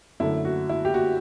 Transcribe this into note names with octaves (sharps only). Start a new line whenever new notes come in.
F#2 D3 A3 E4
F#4
E4
G4
F#4